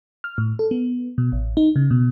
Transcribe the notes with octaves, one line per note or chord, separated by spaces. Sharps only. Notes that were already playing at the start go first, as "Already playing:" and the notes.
F6
A2
A4
B3
B2
A1
D#4
C#3
B2